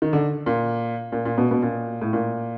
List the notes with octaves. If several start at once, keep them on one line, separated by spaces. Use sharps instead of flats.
D#3
D3
A#2
A#2
A#2
B2
B2
A#2
A2
A#2